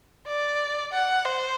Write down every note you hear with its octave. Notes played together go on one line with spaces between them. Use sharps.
D5
F#5
C5